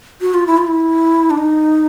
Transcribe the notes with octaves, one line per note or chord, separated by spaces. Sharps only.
F#4
F4
E4
F4
E4
D4
D#4